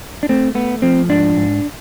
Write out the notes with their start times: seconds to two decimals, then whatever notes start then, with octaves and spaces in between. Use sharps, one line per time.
0.23 D4
0.29 A3 C4
0.55 A3 B3
0.82 F3 C4
1.09 G#2 D4
1.36 G#2